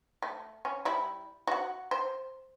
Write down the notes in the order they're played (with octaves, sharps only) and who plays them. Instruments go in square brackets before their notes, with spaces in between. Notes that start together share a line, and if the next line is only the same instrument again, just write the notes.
[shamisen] A3
C#4
G3 E4
F#4 F#5
C5